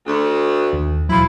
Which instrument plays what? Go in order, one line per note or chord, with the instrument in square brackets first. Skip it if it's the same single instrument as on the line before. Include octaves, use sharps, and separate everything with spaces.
[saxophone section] D2
[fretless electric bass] D#2
[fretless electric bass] E1 F#3 [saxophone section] F3 E4